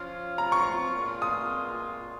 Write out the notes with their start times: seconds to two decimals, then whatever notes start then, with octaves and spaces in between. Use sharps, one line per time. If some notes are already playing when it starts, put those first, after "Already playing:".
Already playing: F3 C#4 F4
0.38 A#5
0.52 C#6
0.95 A#2 G#3 F4
1.22 D#6